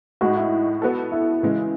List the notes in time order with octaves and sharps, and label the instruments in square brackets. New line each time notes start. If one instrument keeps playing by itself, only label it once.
[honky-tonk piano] A2 G#3 D#4 [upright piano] F#4
[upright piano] E4
[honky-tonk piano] B3 F#4 A4
[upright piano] E4
[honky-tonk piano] C#3 E3 G#3